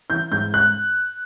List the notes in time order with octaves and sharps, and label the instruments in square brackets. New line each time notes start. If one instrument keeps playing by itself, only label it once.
[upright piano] E3 G6
G#2 G6
F#6